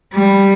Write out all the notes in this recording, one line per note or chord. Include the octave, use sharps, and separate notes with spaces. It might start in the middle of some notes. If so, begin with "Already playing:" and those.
G3